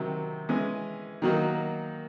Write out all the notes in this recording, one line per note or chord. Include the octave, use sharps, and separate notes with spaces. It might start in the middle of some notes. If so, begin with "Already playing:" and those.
Already playing: C3 D#3 F#3
E3 G#3 C#4
D#3 F#3 A#3 D#4 F#4